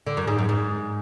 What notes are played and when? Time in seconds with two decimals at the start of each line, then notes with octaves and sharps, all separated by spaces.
0.07 D3
0.17 F#2
0.27 G#2
0.38 F#2
0.49 G#2